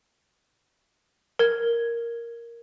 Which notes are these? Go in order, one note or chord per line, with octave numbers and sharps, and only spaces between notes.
A#4 G#6